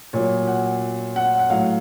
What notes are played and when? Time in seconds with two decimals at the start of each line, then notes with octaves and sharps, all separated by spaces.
0.13 A#2 F#3 C#5
0.47 F#5
1.16 F#5
1.39 F#5
1.50 A2 F#3 F5